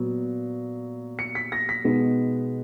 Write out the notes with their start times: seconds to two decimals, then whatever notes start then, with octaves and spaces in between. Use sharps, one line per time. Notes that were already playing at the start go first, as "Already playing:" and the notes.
Already playing: A#2 F#3 B3
1.19 C#7
1.35 B6
1.52 A#6
1.69 B6
1.85 B2 G#3 B3 D#4